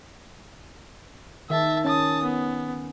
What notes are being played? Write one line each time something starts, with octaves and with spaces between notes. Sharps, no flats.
D#3 E5 A5
C#4 A5 D#6
B3